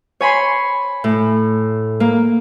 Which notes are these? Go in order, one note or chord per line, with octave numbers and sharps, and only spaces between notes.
C#5 G#5 B5 C6
A2
A#3